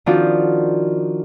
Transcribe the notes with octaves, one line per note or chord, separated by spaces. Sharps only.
D#3 F3 C4 D4 F4 F#4